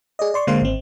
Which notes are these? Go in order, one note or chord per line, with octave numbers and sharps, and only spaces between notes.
G#4 D5 D#5
D5 C6 C#6
D3 G#3 A#3 C5 F5 C6
G#1 C4